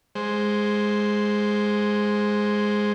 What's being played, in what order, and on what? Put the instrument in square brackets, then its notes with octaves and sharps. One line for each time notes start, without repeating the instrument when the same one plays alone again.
[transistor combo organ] G#3 C5